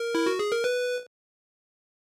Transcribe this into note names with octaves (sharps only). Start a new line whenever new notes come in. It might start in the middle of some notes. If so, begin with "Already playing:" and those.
Already playing: A#4
E4
F#4
G#4
A#4
B4